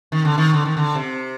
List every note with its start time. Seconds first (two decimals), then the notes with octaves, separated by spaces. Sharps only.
0.12 D#3
0.25 D3
0.38 D#3
0.54 D3
0.65 D#3
0.77 D3
0.95 C3